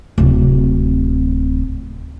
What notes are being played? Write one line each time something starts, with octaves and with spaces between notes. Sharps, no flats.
D1 C3